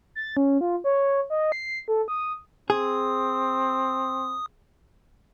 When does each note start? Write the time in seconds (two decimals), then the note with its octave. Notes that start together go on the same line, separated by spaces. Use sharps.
0.15 A6
0.37 C#4
0.61 F4
0.84 C#5
1.30 D#5
1.52 C7
1.88 A4
2.08 D#6
2.70 C4 G#4 D#6